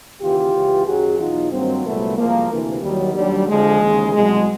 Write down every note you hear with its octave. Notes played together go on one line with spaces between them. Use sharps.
D#2 C#3 E3 F4 G4
C#2 C#3 E3
F#2 D#3 F#3 F#4 G#4
E2 B2 F#3 D#4 F4
G2 D#3 F#3 A#3 C4
C2 A#2 F#3 A3 B3
C2 A#2 F3 G#3 A#3
D2 C3 E3
D#2 D#3 F#3 G3
D#2 D3 F#3 G3
F2 D3 F3 G#3
D#2 C#3 E3
C2 B2 F#3 G#3